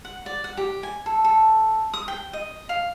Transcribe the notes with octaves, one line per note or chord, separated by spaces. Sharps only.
F#5
D5
F#5
G4
G#5
A4
A4
D#6
G5
D#5
F5